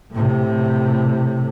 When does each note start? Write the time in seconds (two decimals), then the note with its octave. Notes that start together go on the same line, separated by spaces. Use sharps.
0.12 A2 C3